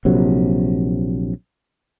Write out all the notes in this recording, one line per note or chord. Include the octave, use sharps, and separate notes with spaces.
A#1 C3 F#3